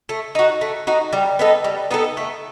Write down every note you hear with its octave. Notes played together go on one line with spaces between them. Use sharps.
A3
D#4 F#4
A3
D#4 F#4
G3
B3 D#4 A4
G3
B3 D#4 A4
A3